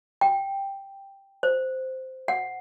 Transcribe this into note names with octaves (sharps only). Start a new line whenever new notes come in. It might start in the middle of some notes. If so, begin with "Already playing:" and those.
G5
C5
F#5